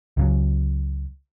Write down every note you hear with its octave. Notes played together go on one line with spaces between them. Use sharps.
C#2 C#3 F#3